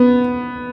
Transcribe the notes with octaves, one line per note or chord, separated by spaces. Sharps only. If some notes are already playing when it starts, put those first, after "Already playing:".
Already playing: B3